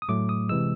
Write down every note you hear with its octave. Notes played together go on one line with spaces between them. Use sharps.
D#6
A2 F#3 A3 D6
D#6
C3 E3 G#3 E6